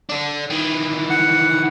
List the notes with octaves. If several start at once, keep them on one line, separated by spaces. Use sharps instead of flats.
D4 A4
D#3 E3
F#5